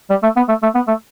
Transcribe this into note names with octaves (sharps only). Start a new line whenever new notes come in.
G3
A3
B3
A3
A3
B3
A3